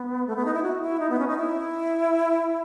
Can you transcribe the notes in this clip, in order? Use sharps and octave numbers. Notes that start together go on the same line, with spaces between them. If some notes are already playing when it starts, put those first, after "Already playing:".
Already playing: B3
A3
B3
D#4
E4
F#4
E4
D#4
B3
C#4
D#4
E4